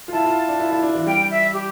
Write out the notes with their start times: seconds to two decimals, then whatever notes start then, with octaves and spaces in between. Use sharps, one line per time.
0.08 F4
0.13 E4 A5
0.24 F4
0.48 D4
0.60 E4
0.71 E4
0.83 D4
0.95 E3
1.07 G3 G5
1.31 E5
1.53 G4